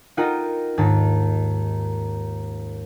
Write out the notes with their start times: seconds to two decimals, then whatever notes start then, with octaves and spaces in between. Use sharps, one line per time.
0.17 D#4 F4 A#4 F#5 G5 A#5
0.77 D#2 G#2 A5